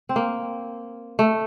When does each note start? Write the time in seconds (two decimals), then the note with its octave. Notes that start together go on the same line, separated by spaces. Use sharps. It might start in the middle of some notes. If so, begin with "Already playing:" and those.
0.09 C4
0.16 A#3
1.19 A3